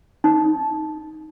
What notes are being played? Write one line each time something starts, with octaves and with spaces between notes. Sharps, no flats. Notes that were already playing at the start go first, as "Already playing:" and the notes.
D#4